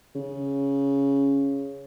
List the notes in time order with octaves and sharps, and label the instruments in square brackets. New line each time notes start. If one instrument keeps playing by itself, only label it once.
[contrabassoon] C#3